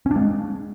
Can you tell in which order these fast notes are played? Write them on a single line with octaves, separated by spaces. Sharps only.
C#4 D4 G#3